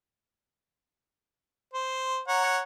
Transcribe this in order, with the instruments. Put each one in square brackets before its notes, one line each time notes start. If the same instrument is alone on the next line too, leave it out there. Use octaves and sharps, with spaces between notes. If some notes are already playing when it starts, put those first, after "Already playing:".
[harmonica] C5
C#5 F#5 A#5